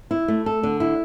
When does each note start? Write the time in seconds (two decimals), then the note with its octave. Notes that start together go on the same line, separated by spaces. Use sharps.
0.11 E4
0.28 A3
0.46 A4
0.63 D3
0.80 E4